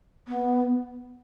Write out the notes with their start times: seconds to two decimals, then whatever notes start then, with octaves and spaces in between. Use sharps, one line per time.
0.28 B3